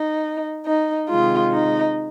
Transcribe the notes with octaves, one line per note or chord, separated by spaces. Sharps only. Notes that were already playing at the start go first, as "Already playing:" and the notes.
Already playing: D#4
D#4
C3 D#3 G#3 F4
D#4